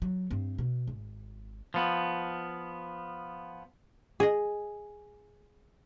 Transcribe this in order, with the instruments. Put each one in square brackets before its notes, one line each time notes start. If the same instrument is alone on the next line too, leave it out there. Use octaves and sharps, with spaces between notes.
[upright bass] F#3
G2 C4
B2
G#1
[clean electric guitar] F3 B3
[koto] G#4 D#5